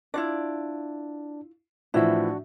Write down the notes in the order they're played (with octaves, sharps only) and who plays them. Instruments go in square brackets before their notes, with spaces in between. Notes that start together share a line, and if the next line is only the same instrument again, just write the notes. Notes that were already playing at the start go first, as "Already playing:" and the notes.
[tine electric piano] D4 [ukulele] E4 F4 D5
[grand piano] A2 E3 F3 [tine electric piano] D4 F#4 [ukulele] E4 E5